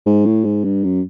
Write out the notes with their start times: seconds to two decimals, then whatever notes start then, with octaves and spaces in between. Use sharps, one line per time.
0.06 G#2
0.25 A2
0.45 G#2
0.64 G2
0.84 F#2